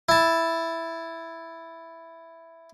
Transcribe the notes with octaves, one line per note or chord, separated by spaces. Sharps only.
E4 A5